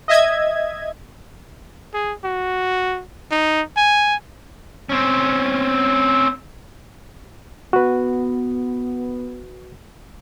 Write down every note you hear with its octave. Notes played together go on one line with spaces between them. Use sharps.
D#5 E5 G#6
G#4
F#4
D#4
G#5
C4 C#4
B3 F#4 B4